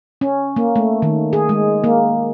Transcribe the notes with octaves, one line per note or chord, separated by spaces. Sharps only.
C#4
A#3
A3
D#3
G#4
G#3
A#3